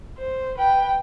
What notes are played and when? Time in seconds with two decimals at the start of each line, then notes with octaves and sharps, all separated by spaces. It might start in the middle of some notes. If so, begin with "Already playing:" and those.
0.18 C5
0.58 B4 G5